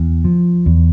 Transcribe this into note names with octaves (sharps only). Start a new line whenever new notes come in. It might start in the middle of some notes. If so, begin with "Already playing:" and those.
Already playing: E2
F3
E2